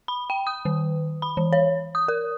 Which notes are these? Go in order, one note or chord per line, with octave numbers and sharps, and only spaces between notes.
B5
G5
D#6
D#3
B5
E3
C#5
D#6
A#4